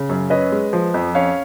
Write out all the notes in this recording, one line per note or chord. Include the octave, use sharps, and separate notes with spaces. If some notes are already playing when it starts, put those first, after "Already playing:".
Already playing: C#3
F#2
C#4 B4 D#5
G#3
F3
F2
C#4 C#5 F5